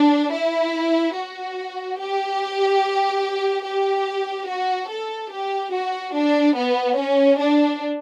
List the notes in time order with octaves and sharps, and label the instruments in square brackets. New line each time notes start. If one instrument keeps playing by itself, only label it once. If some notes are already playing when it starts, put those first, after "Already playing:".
Already playing: [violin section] D4
E4
F#4
G4
G4
F#4
A4
G4
F#4
D4
B3
C#4
D4